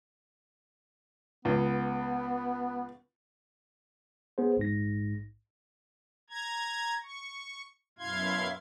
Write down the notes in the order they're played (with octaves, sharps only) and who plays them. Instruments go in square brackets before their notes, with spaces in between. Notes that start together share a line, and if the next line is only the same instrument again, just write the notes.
[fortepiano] C#2 [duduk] B3
[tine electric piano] B3 G#4 C5
A#1 G#2 A#6
[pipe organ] A#5 G#6
C#6
F#2 B2 E4 F5 C6 G#6